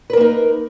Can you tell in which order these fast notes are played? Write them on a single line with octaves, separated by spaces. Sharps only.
B4 A#4 A#3 D#4